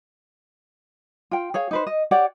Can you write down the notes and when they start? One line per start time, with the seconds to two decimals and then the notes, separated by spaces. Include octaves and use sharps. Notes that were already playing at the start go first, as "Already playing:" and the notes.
1.31 F4 G5
1.54 G#4 C#5 F5
1.71 D#4 B4 C5
1.87 D#5
2.11 G4 C#5 D5 F#5